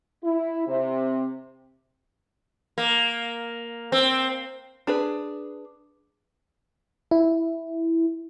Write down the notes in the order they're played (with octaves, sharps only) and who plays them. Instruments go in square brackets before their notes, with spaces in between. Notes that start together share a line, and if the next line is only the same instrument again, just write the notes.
[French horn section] E4
C3
[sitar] A#3
C4
[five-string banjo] D4 G#4 B4
[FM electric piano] E4